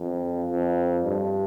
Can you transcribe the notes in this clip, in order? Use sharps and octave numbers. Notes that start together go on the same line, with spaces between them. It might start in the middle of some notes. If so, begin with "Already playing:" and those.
Already playing: F2
F2
G2